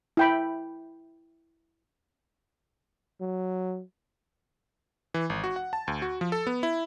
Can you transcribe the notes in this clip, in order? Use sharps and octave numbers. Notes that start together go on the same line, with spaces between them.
E4 G5 B5
F#3
E3
G#1
F#4
F#5
A5
D2
F#4
F3
A4
B3
E4